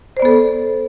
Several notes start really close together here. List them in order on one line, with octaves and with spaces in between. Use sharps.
C5 D5 B3 A4